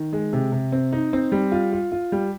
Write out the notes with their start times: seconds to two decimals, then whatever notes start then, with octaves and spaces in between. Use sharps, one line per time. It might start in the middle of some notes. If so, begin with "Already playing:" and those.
Already playing: D#3
0.13 G#3
0.33 C3
0.52 C3
0.72 C4
0.93 D#4
1.13 C4
1.32 G3
1.52 F4
1.73 F4
1.92 F4
2.12 G3